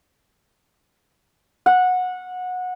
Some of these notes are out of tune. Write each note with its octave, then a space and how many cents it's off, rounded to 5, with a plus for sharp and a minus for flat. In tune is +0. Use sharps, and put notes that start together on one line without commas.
F#5 -20